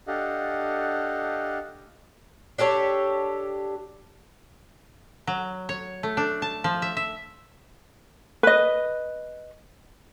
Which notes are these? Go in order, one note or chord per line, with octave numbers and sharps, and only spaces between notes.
D4 G4 A4 D#5 F5 F#5
D4 G4 A4 C#5
F#3
C#5
A3
D4
A5
F3
E5
E5
B4 D#5